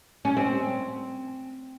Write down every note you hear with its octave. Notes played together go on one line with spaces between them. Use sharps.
C#4
C4